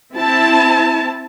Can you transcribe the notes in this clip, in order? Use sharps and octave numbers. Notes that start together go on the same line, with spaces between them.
C4 E4 A5